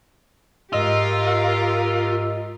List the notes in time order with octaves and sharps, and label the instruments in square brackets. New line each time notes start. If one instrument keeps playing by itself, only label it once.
[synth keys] G#2 D#5 E6 [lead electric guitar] F4 [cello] G4 A#4